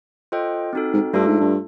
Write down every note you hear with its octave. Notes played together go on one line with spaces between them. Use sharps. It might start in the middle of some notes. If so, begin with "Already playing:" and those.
F4 A4 C5 D#5 G5
C4 D#4 F#4 A4
G#2
G2 A3 D4 F4 A4
G#2
G2